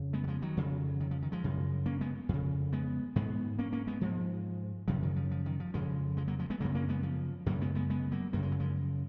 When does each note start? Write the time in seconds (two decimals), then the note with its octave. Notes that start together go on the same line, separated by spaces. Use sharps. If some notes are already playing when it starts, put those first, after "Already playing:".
Already playing: F2 C#3
0.13 G#3 B3
0.24 F#3
0.28 F3 G#3
0.42 D#3 F#3
0.57 F2 C#3
1.00 D#3
1.11 F3
1.22 D#3
1.32 F3 G#3
1.44 F#2 C#3
1.86 A#3 C#4
2.01 G#3 B3
2.29 F2 C#3
2.73 G#3 B3
3.16 G#2 G#3 B3
3.59 A#3 C#4
3.72 A#3 C#4
3.87 G#3 B3
4.01 G#2 F3 G#3
4.88 F#2 C#3 F3
5.03 D#3
5.16 F3
5.31 F3
5.46 D#3
5.60 F3
5.74 F2 C#3 F3 G#3
6.17 F3 G#3
6.28 F#3 A#3
6.39 F3 G#3
6.50 G#3 B3
6.60 F#2 C#3 F#3 A#3
6.75 A#3 C#4
6.89 G#3 B3
7.03 F3
7.46 F#2 C#3 F#3 A#3
7.61 G#3 B3
7.75 G#3 B3
7.90 G#3 B3
8.12 F#3 A#3
8.33 F#2 C#3 A#3
8.43 G#3
8.52 F#3
8.60 F3 G#3